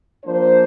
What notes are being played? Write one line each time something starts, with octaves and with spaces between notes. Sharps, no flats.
F3 A#3 D4 C5